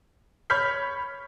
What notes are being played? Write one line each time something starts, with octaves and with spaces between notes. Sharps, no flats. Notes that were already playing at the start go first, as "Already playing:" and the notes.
C#5 B5 F6 G6 B6